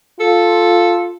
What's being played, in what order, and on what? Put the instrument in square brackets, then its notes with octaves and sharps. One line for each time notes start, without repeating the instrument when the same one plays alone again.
[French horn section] F4 [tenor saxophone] A4